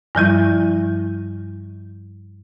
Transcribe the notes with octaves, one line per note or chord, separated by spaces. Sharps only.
G2 F3 G3 E4